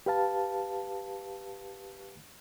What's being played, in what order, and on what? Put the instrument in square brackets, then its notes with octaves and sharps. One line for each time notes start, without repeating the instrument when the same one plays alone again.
[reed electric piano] G4 B4 F5 A5